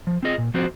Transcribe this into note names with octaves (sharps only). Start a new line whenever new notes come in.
F3
C4 F4 G#4 D#5
A#2
F3 C4 F#4 C5